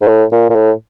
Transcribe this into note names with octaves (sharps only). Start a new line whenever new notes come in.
G#2
A2
A#2
A#2
A2